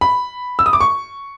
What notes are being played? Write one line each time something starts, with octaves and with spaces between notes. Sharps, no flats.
B5
E6
D#6
D6
C#6